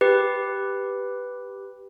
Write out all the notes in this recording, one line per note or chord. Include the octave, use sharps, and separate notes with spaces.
G4 B4